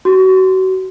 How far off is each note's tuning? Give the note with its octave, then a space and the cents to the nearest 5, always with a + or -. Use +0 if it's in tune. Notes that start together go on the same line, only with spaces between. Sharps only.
F#4 +30